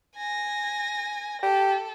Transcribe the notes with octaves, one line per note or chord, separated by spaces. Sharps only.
G#5 A#6
G4 A4